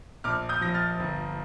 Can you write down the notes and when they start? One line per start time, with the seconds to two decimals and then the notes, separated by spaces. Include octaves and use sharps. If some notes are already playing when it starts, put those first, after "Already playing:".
0.24 A#1 D6 F6
0.49 D#6 G6
0.61 F3 A#6
0.74 F6 A6
0.99 G1